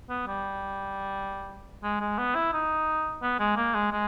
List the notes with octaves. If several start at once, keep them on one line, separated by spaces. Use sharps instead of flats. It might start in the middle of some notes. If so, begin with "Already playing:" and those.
B3
G3
G#3
G#3
B3
E4
D#4
B3
G#3
A#3
G#3
G#3